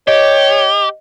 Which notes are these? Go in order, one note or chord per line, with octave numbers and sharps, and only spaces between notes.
G4 C#5 D#5